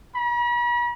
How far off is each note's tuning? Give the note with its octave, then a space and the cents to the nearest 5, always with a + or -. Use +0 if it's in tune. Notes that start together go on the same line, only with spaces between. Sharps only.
B5 -45